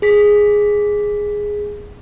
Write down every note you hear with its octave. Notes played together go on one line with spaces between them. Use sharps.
G#4 B6